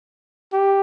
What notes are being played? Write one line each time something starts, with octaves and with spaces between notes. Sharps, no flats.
G4